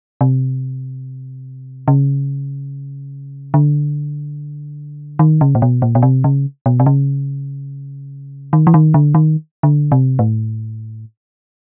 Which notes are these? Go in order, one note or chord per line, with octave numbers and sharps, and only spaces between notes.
C3
C#3
D3
D#3
C#3
A#2
B2
A#2
B2
C3
C#3
B2
C3
C#3
D#3
E3
D#3
D3
D#3
D3
C3
A2